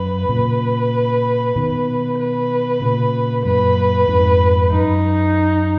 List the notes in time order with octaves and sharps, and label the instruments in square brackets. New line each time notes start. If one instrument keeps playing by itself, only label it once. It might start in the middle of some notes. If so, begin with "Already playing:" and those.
Already playing: [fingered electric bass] F#2 [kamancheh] B4
[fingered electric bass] A#2 C#3
B2 D#3
[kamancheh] B4
[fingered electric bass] A#2 C#3
[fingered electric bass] F#2 A#2 [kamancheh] B4
[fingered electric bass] F2 G#2
[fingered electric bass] F#2 [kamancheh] D#4